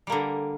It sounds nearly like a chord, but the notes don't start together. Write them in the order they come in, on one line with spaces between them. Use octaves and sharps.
G3 A#3 D3